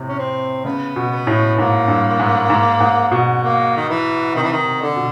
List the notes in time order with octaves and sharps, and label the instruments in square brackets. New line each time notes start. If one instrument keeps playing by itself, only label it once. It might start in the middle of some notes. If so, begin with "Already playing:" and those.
Already playing: [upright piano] A2 C3
[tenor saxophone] C#4
C4
[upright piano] C#3 [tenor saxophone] B3
[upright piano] B2
[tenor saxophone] B3
[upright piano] A2
[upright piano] G#2 [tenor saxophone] A#3
[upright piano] G2
G#2
G#2
G#2
B2
[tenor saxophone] A#3
D#3
E3
[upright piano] C3 [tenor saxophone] D#3
[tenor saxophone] E3
D#3
[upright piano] C3
[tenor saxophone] D3
[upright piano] B2